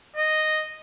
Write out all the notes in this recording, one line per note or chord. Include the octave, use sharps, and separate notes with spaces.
D#5